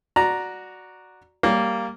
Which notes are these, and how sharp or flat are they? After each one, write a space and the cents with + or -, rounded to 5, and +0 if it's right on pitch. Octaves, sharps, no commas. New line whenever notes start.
F#4 -5 D5 +0 A#5 +0
G3 +0 A#3 -5 C#5 +15